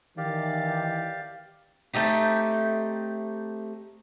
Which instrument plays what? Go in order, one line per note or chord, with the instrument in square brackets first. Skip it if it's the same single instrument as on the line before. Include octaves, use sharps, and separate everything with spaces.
[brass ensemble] D#3 E3 [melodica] G4 D5 F5
[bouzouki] A3 C4 D#4 G4